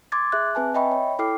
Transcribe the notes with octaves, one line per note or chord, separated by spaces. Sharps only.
C6 D6 G#6 A6
G#4 E5 F#6
C4 B4 G#5 A5
D#5 E5 G5 B5 C#6
C#5 B5
E4 A4 G5 D6 F6 C7